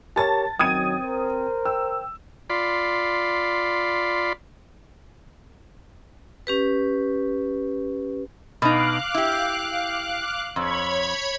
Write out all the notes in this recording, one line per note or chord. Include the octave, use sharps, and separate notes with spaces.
G4 A#4 C#5 A5 A6
F#2 D#3 F#3 C4 G5 D#6 G#6 D#7
A#4 C5
G5 E6
F4 D5 B5 C6
C#4 G4 B4
B2 D#4 F5 D6 F#6
E4 G4
F2 C#5 B5 G#6